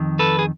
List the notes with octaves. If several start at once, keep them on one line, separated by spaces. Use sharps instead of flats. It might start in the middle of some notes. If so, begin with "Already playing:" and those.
Already playing: F2 D#3
A4 B4
G#4